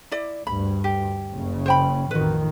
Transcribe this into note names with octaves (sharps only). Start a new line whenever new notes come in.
E4 D5
D2 G2 B5
G4
F#1 C#3
C5 G5 B5
A1 F2 D#3 F#4 B4